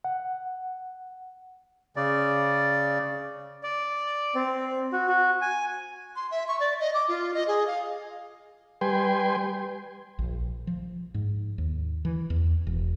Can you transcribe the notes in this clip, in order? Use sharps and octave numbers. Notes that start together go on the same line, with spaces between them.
F#5
C#3 D5
D5
C4
F#4
F#4
G#5
C6
E5
C#6
D5
D#5
D6
F4
D#5
G#4
F5
G3 B4 G5 G#5 C6
A#1
F3
G#2
D#2
E3
E2
E1